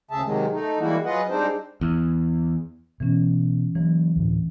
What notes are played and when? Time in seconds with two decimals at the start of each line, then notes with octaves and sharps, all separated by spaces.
0.11 D2 C#3 G#4 E5 A5
0.24 C3 D#3 F#3 G#3
0.51 A3 D#4
0.79 E3 G3 G#3 A#3 E4 F#4
1.05 F#3 F4 G#4 B4 D#5 F#5
1.29 G3 G#3 C4 D4 D#4 C5
1.81 E2
3.00 B2 E3 C#4
3.75 E3 F#3 A#3
4.16 D2 A2